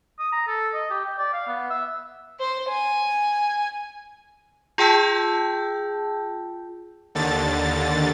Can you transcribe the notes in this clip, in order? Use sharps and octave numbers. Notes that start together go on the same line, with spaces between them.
D#6
A#5
A4
D#5
G4
G5
D5
F5
B3
E5
C5
G#5
F4 G#4 G5 A5 E6 G6
D#2 D3 A6